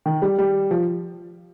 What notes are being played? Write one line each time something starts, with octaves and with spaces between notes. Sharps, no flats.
D#3
G3
G3
F3